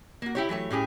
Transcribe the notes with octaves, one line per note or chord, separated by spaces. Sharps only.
A#3 F#4
E4 G4 C#5
E3 F#3 A3 C#5
A2 C#4 G4 G#4